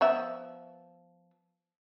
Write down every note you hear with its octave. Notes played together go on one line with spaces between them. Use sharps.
F3 B3 E5